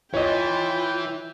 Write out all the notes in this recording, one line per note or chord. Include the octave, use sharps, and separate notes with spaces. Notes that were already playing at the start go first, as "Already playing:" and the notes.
E3 F4 C#5 D#5 G5